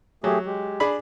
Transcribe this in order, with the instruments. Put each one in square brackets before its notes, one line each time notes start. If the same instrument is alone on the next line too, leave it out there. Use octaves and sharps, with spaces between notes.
[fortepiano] F#3 [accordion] A3 G4 G#4
[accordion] G#3 G4
[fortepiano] D4 G#4 B5